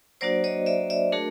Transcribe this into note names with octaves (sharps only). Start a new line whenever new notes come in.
F#3 A#3 D4 F#4 C5 D5
C#5 D#5
D5 E5
D5 E5
A3 D4 F#4 G#4 A#4